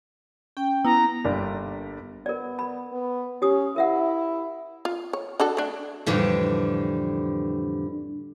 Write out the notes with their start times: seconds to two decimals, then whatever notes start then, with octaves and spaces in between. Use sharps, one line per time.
0.57 C#4 G5
0.85 B3 E4 A#5
1.24 G1 G3 A#3 D4 D5
2.26 B3 A#4 D5
2.59 B5
2.93 B3
3.42 C#4 G4 D#6
3.76 E4 A#4 E5 F#5
4.85 F4
5.13 C#5
5.40 D4 F#4 A4
5.57 A3 D4
6.06 F2 A2 D3 E3 G3